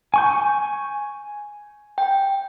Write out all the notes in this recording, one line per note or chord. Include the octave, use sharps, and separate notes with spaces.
G#5 C#6 G6
G5